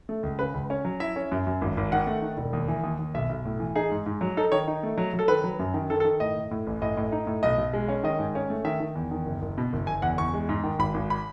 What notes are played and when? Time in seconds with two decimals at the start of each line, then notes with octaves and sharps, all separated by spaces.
0.09 A3
0.23 C#2
0.39 C#3 B4
0.54 C#2
0.70 C#4
0.85 F#3
1.00 E4 E5
1.16 C#4
1.32 F#2
1.47 F#2
1.61 G#1
1.77 G#1
1.92 D#3 F#5
2.07 A3
2.22 D#3
2.37 E1
2.53 D#2
2.68 E3
2.84 D#2
2.99 D#2
3.14 B1 E5
3.29 B1
3.45 A2
3.60 E3
3.76 D#4 G#4
3.91 G#2
4.06 G#2
4.21 F#3
4.37 D#4 A4
4.52 D#3 C#5
4.67 D#4
4.83 A3
4.98 F#3
5.14 F#3
5.19 A4
5.28 D#3 B4
5.44 F#3
5.59 F#2
5.74 D#3
5.90 D#3 A4
6.00 A4
6.05 D#3
6.20 A2 D#5
6.36 A2
6.51 A2
6.67 A1
6.82 A2 D#5
6.97 A2
7.12 D#4
7.27 A2
7.43 B1 D#5
7.58 B1
7.73 G#3
7.89 C#4
8.03 D#3 D#5
8.19 G#2
8.35 C#4
8.50 A3
8.65 D#3 E5
8.80 D#3
8.95 E2
9.11 D#3
9.26 F#1
9.42 F#1
9.58 B2
9.73 F#1
9.87 F#1 G#5
10.02 E2 F#5
10.18 E2 C#6
10.34 G#3
10.49 G#2
10.64 D#3
10.79 G#1 B5
10.94 G#1
11.10 B5